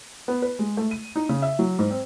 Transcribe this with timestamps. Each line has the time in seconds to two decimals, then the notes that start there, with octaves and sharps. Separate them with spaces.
0.28 B3
0.42 B4
0.59 G#3
0.77 A3
0.91 D#7
1.16 D#4
1.29 C#3
1.42 E5
1.59 F#3
1.79 G#2
1.91 C4